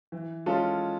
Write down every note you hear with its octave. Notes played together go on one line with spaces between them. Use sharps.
E3
G#3 C#4 F4 A4